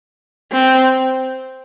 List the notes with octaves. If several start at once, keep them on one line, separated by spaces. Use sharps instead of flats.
C4